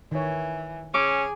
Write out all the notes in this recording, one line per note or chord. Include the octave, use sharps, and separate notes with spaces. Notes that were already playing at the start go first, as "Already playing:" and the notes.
D#3 E3 C#5
C#4 G#4 D6